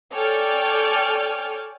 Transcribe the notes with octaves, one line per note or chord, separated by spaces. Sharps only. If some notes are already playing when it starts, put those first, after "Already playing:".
A4 C#5 D5 G5 G#5 F6